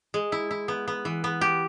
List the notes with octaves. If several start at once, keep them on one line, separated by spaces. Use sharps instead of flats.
G#3
E4
E4
B3
B3
E3
B3
G4